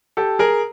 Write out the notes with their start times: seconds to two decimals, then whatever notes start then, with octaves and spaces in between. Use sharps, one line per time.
0.17 G4 A4
0.39 G#4 A#4